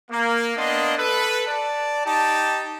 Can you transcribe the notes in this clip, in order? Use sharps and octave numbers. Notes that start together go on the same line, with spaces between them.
A#3
A#3 B3 D4 D#5 C6
A4 B4
D5 A5
D#4 G4 A5